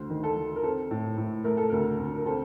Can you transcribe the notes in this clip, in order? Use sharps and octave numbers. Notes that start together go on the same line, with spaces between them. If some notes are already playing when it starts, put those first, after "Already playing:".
Already playing: D2 C5
D#3
A4
D#3
A#4
C4 A4
A2
A2
A3 A#4
A4
D2 A#4
D2
A#4
C4 A4